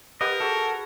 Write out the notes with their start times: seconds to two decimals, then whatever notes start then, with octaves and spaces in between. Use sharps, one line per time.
0.21 G4 A#4 B4 D#5 F#5
0.40 F#4 G#4 A4